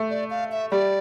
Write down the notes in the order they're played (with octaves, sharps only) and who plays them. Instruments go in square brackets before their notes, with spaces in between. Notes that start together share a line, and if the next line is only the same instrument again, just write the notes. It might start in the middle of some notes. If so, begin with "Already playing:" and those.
Already playing: [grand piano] A3
[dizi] D5
F5
E5
[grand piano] G3 [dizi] D5